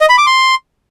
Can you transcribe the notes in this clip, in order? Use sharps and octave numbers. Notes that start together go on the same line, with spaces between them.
D#5
B5
D6
C6